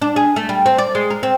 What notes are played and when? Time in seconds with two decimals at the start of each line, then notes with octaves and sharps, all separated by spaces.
0.02 D4
0.16 G#4
0.36 A3
0.49 G3
0.66 C4
0.78 D5
0.95 G#3
1.10 A#4
1.23 C4